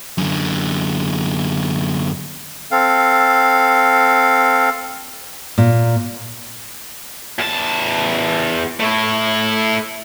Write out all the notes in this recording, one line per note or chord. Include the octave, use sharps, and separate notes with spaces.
F#2 D3
C4 A4 F5
A#2
E2 A5
A3 E4